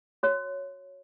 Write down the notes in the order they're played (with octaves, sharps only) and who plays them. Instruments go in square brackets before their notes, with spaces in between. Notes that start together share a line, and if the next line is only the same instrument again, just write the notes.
[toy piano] F#4 C#5